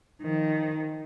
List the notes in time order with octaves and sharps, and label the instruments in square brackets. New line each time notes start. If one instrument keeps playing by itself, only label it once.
[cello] D#3 F3